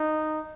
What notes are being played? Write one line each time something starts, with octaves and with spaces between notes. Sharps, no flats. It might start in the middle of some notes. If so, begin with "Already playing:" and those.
Already playing: D#4